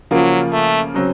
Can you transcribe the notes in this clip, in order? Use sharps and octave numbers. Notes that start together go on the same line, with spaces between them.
C#3 F3 F#3 A#3 F4
A3
C#3 F#3 C4